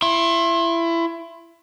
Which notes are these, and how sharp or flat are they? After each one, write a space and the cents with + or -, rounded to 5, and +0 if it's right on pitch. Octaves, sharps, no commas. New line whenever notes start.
E4 +25 C6 +35